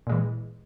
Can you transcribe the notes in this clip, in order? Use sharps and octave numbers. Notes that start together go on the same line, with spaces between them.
A#2 E3 G#3